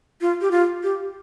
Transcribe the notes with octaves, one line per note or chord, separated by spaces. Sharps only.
F4
G4
F4
G4